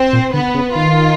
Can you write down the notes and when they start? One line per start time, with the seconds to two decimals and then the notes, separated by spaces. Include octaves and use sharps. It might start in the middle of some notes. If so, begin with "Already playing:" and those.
Already playing: C4 C5
0.13 A#2
0.33 D3 B3 B4
0.54 C#3
0.75 D#3 F4